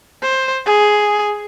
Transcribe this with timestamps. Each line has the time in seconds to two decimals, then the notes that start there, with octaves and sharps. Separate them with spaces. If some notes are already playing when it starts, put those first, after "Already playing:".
0.22 C5
0.66 G#4